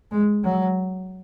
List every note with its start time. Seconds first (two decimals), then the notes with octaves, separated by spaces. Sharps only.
0.12 G#3
0.44 F#3